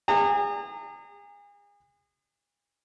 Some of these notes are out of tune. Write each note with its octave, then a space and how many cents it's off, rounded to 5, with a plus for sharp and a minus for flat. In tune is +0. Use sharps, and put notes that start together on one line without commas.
G#4 -35 A#5 -35